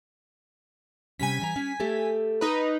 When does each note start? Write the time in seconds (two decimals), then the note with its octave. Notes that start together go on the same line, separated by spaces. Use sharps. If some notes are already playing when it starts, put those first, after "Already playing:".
1.19 C3 G3 C#4 G#5 B6
1.42 E3 A#5
1.56 C#4
1.80 A3 G4 A4
2.41 D#4 B4